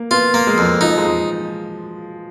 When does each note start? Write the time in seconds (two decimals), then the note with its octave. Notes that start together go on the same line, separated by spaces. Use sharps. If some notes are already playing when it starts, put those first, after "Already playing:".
Already playing: A#3
0.11 B3 F4
0.34 A#3
0.47 G#3
0.58 F2
0.81 F3 D#4
0.98 G#3